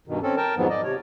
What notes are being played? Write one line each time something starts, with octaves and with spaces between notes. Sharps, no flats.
G2 B2 D#3
C4 C#4 A4
A#4 G5 A5
F2 G#2 D#3 F3 F#3 B3
D5 D#5
C3 C#5